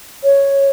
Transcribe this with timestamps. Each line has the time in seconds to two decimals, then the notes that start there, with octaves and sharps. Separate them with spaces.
0.24 C#5